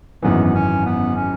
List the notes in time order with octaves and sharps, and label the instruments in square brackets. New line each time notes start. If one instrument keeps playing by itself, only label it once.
[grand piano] G#1 F#2 E3 [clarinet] B3
[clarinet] B3
C#4
B3
C#4